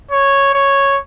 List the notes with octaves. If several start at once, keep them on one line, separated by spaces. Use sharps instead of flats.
C#5
C#5